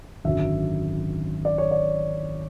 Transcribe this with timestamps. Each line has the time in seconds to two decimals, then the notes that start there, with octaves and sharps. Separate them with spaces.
0.25 G#1 F#2 D3 F#3 E5
1.45 D5
1.58 C#5
1.71 D5